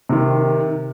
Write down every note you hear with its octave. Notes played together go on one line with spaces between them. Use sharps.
C3 D#3